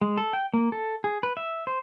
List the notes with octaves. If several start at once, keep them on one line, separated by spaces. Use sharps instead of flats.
G#3
A4
G5
A#3
A4
G#4
B4
E5
C5